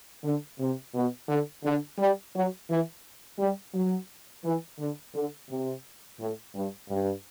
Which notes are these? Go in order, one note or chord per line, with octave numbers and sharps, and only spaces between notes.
D3
C3
B2
D3
D3
G3
F#3
E3
G3
F#3
E3
D3
D3
C3
A2
G2
G2